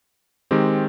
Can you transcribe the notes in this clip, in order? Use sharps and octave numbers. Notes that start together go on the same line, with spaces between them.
D#3 G#3 C4 G4